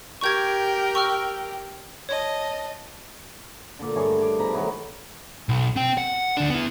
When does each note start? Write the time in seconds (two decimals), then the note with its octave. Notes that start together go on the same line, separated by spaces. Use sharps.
0.21 G4 A#4 G5 C#6 G6 G#6
0.95 C#6 E6 F6
2.09 C#5 D#5 A5
3.79 A#2 D3
3.96 G2 A3 G#4 C#5
4.21 D6
4.39 B2 F3 A#5 B5
4.53 D#3 F#3 A3 B3
5.49 B1
5.76 C4 G5
5.98 F#5
6.37 D2 D4
6.50 B3 E4